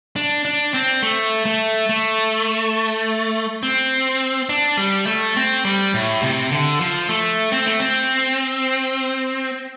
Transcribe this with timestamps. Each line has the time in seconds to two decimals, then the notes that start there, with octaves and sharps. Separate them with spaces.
0.16 D4
0.45 D4
0.74 C4
1.03 A3
1.46 A3
1.89 A3
3.63 C4
4.49 D4
4.78 G3
5.07 A3
5.36 C4
5.65 G3
5.94 A2
6.22 C3
6.51 D3
6.81 F3
7.09 A3
7.52 C4
7.66 A3
7.80 C4